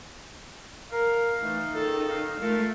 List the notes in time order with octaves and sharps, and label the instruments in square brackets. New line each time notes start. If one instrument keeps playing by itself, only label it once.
[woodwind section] A#4 [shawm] F5
[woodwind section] E3 A3 [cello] D#4
[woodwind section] C#2 D#3 A4
[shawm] F5
[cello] A3 [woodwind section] F4 A4 A#4